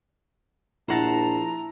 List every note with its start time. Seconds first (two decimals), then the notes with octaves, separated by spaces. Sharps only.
0.88 A#1 E4 C5 F#5 A5 A#5 A#6